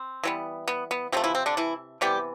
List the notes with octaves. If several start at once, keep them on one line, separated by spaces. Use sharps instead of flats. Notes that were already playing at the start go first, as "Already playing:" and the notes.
Already playing: C4
E3 G3 B3
B3
B3
C3 F3 A3 C4
E3 E4
C4
D3 D4
E3 E4
C3 E3 G3 B3 G4